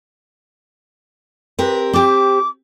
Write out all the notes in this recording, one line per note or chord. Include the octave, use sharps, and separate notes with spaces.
C4 G4 A#4 B4
C4 G4 D6